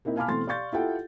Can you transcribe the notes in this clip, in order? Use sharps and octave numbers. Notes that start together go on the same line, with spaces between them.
A#3 C4 D#4 E4
F5 G#5 A5 B5 D6 F6
B2 E3 A3 C4 C6 A6
D5 F5 C6 C#6 G6 A6
E4 F4 G4 A4 F#5 G5